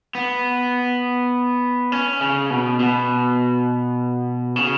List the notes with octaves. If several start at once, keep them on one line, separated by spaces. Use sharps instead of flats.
B3
C#4
C#3
B2
B2
C#3